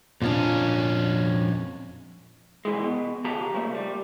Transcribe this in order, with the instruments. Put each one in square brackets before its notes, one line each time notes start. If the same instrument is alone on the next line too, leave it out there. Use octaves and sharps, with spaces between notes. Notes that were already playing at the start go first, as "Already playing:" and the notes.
[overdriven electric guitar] F2 C#4 [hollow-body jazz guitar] A#2 F3 D4
[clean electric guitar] C2 E3 G#3
B2
C#3 F3 G4 A5 A#5
C#3 F3 F#3 A3 A#3
G3